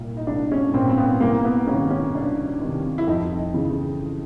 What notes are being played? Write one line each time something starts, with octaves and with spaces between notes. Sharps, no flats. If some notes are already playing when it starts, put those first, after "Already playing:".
Already playing: C2 A#2
D#4
C2 D4
C#4
A#2 C4
C4
B3
C2 A#3
B3
C3 D#3 C#4
C#4
C2 D4
C3 D#3
E4
F2 D#4
C#3 E3